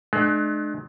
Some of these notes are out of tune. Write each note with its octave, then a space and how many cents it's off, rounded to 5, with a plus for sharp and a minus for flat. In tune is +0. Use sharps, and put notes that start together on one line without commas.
G#3 +45 D4 +40